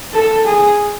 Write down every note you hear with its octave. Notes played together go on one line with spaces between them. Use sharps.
A4
G#4